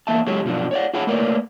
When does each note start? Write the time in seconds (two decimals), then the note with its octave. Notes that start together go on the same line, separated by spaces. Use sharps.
0.07 E2 A#3 E5 A5
0.27 F#3 G#3 G4 A4 C#5
0.45 G2 B2 F3 F#3 D4
0.71 C#5 D5 F#5
0.93 F4 G#4 C#5 F#5 A5 B5
1.07 A3 A#3 A#4 B4 C#5 D5